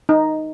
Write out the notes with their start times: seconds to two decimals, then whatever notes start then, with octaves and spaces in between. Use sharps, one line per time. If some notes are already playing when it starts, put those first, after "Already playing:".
0.09 D#4